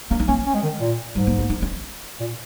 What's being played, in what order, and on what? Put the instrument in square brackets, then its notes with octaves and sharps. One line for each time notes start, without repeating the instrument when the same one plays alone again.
[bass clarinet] A#3 [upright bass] C#4
[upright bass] D#4
[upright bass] A#3 [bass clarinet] C#4
[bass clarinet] C#4
G#3
D#3
A#2
[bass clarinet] G#2 [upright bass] F#3
[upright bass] A#3
A#3
D#4
C#4
[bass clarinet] A#2